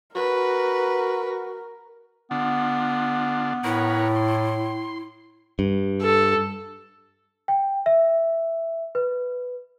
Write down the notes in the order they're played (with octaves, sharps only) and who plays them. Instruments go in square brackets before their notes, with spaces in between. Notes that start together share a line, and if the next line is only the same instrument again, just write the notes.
[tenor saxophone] F#4 [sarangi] A#4 [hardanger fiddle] B4
[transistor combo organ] D3 D4 F4 [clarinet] B3
[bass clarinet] A2 [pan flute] E4 [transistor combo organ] A#4 B4 C#5
[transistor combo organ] C6
[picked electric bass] G2
[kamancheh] A4
[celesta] G5
E5
B4